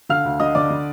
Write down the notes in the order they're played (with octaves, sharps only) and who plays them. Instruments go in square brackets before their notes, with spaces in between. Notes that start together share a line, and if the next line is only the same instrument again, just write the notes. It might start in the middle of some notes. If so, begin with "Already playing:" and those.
[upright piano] D3 F5 F6
D2
D3 D#5 D#6
D3 D5 D6
D3